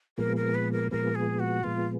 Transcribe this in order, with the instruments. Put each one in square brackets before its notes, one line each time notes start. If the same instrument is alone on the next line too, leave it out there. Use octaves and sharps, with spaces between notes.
[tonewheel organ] A#2 F3 G#3 B3 [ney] A#4
[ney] A#4
B4
A#4
[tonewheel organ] A#2 F3 G#3 B3 [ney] A#4
[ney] G#4
F#4
[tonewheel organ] A#2 F3 G#3 B3 [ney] F4